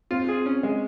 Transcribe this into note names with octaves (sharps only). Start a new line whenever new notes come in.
C4 F4
G#4
C#4
G#3